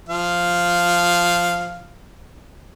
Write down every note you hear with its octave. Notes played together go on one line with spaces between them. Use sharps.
F3 F5